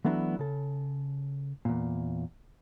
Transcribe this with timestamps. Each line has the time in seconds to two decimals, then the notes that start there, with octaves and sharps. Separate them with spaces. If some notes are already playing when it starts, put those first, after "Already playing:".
0.05 E3 F#3 A3 B3 D4 E4
0.39 C#3 A4
1.65 E2 A#2